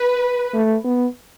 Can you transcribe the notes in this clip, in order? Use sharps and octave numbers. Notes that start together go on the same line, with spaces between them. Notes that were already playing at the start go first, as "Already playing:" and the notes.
Already playing: B4
A3
B3